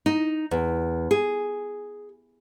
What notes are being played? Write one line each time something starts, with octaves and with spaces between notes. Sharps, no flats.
D#4
E2
G#4